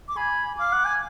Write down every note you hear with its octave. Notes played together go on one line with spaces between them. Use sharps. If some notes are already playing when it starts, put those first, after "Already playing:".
D6
G#5 B5
F5 D6
F#5
G#5